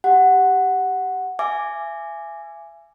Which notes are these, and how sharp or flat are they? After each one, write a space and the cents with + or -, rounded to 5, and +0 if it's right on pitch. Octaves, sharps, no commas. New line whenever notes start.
G4 +0 F#5 +0
E5 +35 G#5 +0 D6 +0